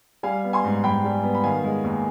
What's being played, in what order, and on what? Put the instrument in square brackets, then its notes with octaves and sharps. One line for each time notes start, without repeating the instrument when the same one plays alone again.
[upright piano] G3 F5 G#5
B3
G#5 C6
G#2
G#2 G5 B5
G3
B3
B5
D#3 F5 G#5
G#3
D#2